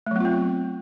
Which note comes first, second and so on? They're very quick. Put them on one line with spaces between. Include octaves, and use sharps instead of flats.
A3 F#3 B3 F4 C4